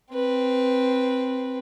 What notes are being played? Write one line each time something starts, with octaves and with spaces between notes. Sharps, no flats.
C4 B4